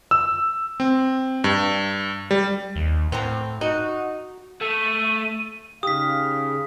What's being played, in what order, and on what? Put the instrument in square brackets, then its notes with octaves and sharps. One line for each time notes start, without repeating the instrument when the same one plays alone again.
[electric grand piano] E6
C4
G2
G3
[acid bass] D#2
[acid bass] A2 [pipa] C4 F#5 A#5
[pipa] D#4 [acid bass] F#4
[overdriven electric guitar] A3 [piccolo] D#7
[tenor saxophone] C#3 [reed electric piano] D#4 G4 [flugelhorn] F5 [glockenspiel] D#6 B6